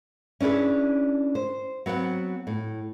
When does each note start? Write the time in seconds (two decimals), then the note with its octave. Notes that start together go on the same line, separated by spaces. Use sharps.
0.40 C#4 D4 E4 G#4 B4
1.35 C5
1.86 F#3 B3 C4 F#5
2.47 A2